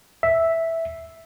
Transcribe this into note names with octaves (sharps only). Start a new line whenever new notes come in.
E5